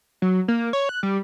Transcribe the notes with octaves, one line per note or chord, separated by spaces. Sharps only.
F#3
A#3
C#5
F#6
G3